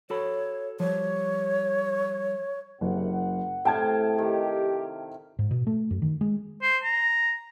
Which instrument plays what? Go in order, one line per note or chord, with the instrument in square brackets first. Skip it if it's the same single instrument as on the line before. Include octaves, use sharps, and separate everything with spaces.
[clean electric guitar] F#4 A4 B5 [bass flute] C#5
[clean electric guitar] F3 G3 [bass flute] C#5
[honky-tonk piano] F#1 [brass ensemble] F#2 C3 F#5
[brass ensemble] F#5
[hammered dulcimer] A2 C3 F5 [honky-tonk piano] G5 A5 G#6
[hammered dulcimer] D#3 [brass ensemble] G4
[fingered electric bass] G#2
B2
A3
F#2
D#3
G#3
[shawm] C5
A#5